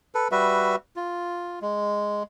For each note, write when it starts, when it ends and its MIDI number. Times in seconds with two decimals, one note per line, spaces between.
0.15 0.28 69
0.15 0.28 71
0.32 0.76 55
0.32 0.76 66
0.32 0.76 71
0.32 0.76 76
0.96 1.59 65
1.62 2.23 56